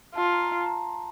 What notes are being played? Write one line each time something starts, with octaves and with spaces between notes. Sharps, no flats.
F4 A5
A#5
A#5
C6
A5
A#5